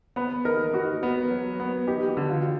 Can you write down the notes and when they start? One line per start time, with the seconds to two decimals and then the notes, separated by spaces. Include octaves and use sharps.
0.16 B3 B4
0.45 D#4 A#4
0.73 D#4 F#4
1.03 B3
1.30 F#3
1.60 B3
1.87 D#4 G4
2.09 F#4
2.17 D3
2.30 F4